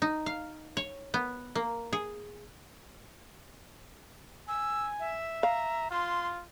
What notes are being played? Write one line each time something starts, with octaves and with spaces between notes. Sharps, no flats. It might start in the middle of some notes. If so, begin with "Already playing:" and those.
D#4
F5
C#5
B3
A#3
G#4
G#5 E6
E5
F5 A#5
F4 C6